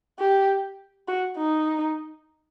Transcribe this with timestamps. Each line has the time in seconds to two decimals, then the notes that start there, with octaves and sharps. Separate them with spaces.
0.19 G4
1.08 F#4
1.38 D#4